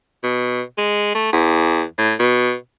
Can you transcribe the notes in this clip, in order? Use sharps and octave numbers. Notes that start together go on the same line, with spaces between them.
B2
G#3
A3
E2
A2
B2